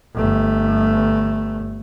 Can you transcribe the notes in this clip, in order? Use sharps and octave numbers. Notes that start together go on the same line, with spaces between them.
G1 A3